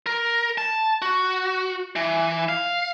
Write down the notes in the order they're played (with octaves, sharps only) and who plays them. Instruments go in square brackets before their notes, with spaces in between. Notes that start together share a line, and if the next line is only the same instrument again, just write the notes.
[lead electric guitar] A#4
A5
F#4
E3
F5